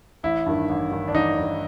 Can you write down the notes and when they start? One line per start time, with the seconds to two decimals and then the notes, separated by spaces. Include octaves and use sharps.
0.23 A1 E4
0.46 G2 D#3
0.69 A1
0.91 G2 D#3
1.08 D4
1.14 A1 D#4
1.37 G2 D#3